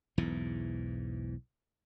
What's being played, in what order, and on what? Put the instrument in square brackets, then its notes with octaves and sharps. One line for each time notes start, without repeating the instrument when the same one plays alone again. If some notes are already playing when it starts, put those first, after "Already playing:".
[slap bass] B1 E2 G#2 E3